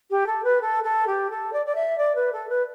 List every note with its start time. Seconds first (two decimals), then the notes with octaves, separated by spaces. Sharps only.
0.11 G4
0.27 A4
0.44 B4
0.61 A4
0.84 A4
1.07 G4
1.30 A4
1.53 D5
1.66 D5
1.75 E5
1.98 D5
2.15 B4
2.33 A4
2.49 B4